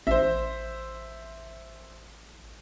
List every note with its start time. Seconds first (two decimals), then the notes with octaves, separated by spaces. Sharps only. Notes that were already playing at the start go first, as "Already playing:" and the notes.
0.07 A1 C5 E5